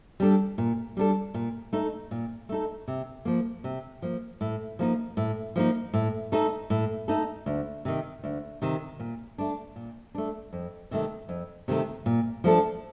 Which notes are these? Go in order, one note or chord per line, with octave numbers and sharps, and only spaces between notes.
G3 D4 A4
A#2
G3 D4 A4
A#2
A3 D#4 A4
A#2
A3 D#4 A4
C3
F3 A#3
C3
F3 A#3
A2
F3 A#3 D#4
A2
F3 A#3 D#4
A2
A3 D#4 A4
A2
A3 D#4 A4
D2
C3 D#3
D2
C3 D#3
A#2
A3 D4
A#2
A3 D4
F2
C3 D#3 A3
F2
C3 D#3 A3
A#2
F3 A3 D4 A4